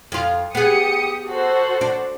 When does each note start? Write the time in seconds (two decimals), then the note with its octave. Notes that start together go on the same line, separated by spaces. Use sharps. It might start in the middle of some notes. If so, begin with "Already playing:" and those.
0.12 F2 F4
0.55 B3 G4 G#4 D#6 C#7
1.27 F#4 A4 C5
1.81 D4